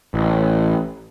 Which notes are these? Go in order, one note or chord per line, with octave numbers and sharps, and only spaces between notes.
A1